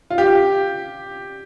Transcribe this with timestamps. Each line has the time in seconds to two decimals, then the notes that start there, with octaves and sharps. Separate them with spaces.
0.10 F4
0.18 G4